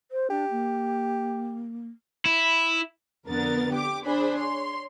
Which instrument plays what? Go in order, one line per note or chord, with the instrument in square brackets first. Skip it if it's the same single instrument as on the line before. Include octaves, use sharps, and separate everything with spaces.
[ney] C5
[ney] D4 [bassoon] G4
[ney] A#3
[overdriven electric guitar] E4
[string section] F2 D3 B3 A#4 A6
G4 D6
D4 G#4 C5 B5
C#5 C6